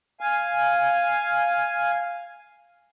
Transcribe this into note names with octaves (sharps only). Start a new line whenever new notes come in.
F5 G#5